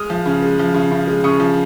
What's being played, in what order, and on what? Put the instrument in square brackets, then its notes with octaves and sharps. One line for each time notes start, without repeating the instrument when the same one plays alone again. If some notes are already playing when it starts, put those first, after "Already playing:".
Already playing: [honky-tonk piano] G#3 D#6 F6
F3
C#3
G#3
F3
C#3
C#3
G#3
C#3 C#6 D#6
F3